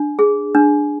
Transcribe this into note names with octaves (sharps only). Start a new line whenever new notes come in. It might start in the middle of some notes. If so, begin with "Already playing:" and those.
Already playing: D4
G#4
D4